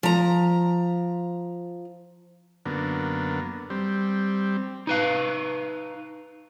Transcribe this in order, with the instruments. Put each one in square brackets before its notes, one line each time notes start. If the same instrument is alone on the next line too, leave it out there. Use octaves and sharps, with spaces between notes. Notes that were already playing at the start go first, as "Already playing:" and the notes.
[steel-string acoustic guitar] F3 A#5
[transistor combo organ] F#2 D3 A#3 B3
G3 C4
[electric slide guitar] D#4 B4 F5